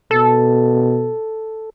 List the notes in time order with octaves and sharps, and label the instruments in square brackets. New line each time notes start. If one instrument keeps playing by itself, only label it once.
[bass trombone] B2 [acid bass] A4